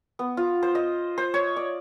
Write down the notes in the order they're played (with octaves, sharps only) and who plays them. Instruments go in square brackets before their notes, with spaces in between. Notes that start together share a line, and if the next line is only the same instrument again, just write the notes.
[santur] B3
F4
C5
D#5
C5
C#5
D5